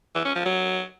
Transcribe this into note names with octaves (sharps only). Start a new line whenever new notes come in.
E3
C#4
F3
F#3